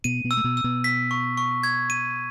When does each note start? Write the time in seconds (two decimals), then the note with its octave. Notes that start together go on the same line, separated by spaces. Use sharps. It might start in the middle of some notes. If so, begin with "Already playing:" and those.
0.04 B2 B3 D#7
0.24 B2 B3
0.31 E6
0.37 A3
0.44 B2 B3
0.57 E6
0.64 B2 B3
0.84 B6
1.11 C#6
1.37 C#6
1.63 G#6
1.90 D#7